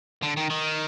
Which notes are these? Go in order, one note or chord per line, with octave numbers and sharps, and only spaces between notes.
D3
D#3
D#3